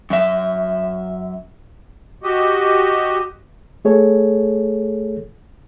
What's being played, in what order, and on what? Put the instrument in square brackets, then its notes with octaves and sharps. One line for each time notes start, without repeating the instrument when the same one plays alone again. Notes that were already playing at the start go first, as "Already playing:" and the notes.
[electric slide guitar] F#2 E5
[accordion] F#4 G4 D#5
[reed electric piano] A3 G#4 A4 C#5